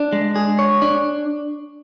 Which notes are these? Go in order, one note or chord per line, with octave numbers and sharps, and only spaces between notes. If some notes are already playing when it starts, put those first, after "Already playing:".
Already playing: D4
G#3
G#4
C#5
D4